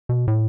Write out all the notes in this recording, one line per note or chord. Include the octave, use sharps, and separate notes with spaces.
B2
A2